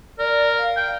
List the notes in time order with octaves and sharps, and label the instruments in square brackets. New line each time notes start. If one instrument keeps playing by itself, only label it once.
[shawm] A#4 [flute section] D5
[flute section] F5
[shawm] G5